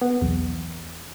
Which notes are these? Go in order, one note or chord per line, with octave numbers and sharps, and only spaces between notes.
B3
B1 E2